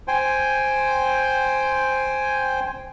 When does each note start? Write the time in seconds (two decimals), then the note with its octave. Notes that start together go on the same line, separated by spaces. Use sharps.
0.08 C5 G5 G#5